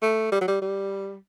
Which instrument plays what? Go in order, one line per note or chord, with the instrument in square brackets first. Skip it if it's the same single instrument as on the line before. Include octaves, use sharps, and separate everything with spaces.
[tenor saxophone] A3
G3
F#3
G3
G3